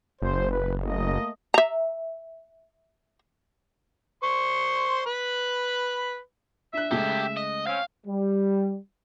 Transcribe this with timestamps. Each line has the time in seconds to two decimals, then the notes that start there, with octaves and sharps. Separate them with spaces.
0.22 F#1 C5
0.51 B4
0.85 A3 A#3 D#5
1.54 E5 A#5
4.23 C5 C6 C#6
5.06 B4 B5
6.73 D4 E5 F#6
6.91 C#3 G#3 A3 G4 A4
7.37 D#5
7.67 C4 C#4 F5
8.07 G3